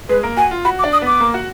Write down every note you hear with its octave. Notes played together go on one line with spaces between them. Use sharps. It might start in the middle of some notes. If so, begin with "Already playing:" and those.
G#3 G#4 B4
A#3 A#4
F#4 G#5
F4
F#4 B5
D6
D4 D5
D#6
B3 B4 D6
A#3 A#4
F#4 F#5